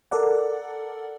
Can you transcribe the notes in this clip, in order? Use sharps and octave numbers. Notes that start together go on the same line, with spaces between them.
A4 A#4 D5 F#5